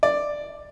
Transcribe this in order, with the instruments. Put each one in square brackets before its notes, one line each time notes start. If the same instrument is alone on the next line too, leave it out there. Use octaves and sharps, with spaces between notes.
[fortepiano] D5